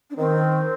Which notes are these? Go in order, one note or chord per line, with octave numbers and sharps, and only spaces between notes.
D4
D#3 C4